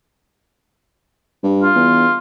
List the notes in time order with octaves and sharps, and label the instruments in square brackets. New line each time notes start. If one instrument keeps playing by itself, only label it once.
[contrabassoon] G2
[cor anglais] F4
[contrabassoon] E2